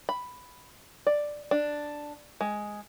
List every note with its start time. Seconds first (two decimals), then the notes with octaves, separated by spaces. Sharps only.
0.09 B5
1.07 D5
1.51 D4
2.41 G#3